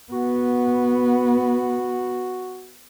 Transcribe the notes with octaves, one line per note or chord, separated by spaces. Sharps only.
B3 F#4